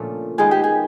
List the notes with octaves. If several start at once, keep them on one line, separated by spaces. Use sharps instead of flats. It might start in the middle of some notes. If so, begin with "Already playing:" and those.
Already playing: A#2 C#3 F3 A3 C#4 D4
D#3 G#3 B3 G#4
G4
G#4